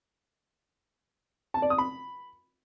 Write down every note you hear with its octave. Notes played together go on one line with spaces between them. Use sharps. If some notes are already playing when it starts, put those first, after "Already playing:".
A5
D5
D#6
B5